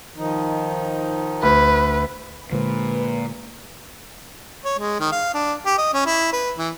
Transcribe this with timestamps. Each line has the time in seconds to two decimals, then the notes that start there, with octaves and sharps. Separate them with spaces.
0.16 D#3 F3 D#4
1.43 D2 B4
2.52 A#2 D3 G#3 B4 C5
4.65 C#5
4.79 G#3
5.00 D#3
5.12 F5
5.34 D4
5.66 G4
5.78 D#5
5.93 C#4
6.06 E4
6.33 B4
6.58 E3